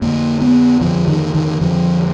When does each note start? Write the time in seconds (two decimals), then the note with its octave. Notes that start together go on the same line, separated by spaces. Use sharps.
0.02 F2 D3 A#3
0.42 B3
0.81 F2 D3 F3
1.08 D#3
1.34 D#3
1.61 F2 D3 F3